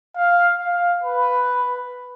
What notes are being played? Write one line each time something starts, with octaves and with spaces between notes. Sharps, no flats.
F5
F5
B4